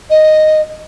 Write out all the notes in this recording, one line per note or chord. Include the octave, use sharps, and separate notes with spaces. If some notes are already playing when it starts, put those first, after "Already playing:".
D#5